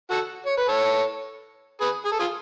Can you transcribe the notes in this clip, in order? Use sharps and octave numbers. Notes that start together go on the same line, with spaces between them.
F#4 A4
C#5
B4
A4 C#5
G#4 B4
G#4
A4
F4 G#4